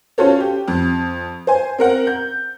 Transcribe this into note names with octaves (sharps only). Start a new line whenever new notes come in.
C#4 F4 F#4 A4 C5 C#5
G4
F2
C5 G#5
C4 A#4 F#5
G6